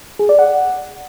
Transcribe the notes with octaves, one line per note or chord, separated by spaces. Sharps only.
G#4
D5
F#5